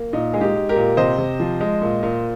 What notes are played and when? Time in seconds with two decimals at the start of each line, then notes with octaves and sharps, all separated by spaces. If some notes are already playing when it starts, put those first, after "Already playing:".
Already playing: A#3
0.13 A#2 D#4
0.33 G#3 G#4
0.41 D#4 G4
0.56 G#3
0.69 G4 A#4
0.76 A#2
0.97 C3 C5 D#5
1.18 C3
1.40 F3
1.61 G#3
1.82 A#2
2.03 A#2